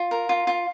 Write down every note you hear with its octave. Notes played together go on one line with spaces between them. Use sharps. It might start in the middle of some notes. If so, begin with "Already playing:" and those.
Already playing: F4
A#4
F4
F4